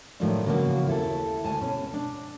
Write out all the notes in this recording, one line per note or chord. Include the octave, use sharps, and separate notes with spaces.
A2 D#3 F3 F#3 A3 D4
C#3 E3 F3 A#3 F#4
D#2 E4 A4
D2 G#5 A5
B2 C#4
D4